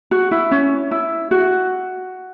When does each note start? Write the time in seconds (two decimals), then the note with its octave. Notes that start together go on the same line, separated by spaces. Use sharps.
0.11 F#4
0.31 E4
0.51 C#4
0.91 E4
1.31 F#4